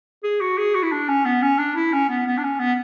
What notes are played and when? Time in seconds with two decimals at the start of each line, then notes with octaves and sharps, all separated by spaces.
0.23 G#4
0.41 F#4
0.58 G#4
0.75 F#4
0.83 E4
0.92 D4
1.08 C#4
1.25 B3
1.42 C#4
1.58 D4
1.75 E4
1.93 C#4
2.09 B3
2.27 B3
2.38 D4
2.43 C#4
2.59 B3